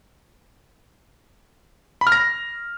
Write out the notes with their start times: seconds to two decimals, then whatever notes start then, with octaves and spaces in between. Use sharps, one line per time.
2.01 B5
2.07 F6
2.12 A#6